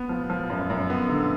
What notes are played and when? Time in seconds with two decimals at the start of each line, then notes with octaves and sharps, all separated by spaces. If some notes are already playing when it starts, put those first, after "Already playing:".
Already playing: B3
0.09 F3
0.30 F3
0.50 F#2
0.70 F#2
0.90 B3
1.09 D3